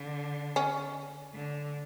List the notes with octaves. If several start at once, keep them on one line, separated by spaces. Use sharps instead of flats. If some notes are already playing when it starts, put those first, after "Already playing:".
Already playing: D3
C#4
D3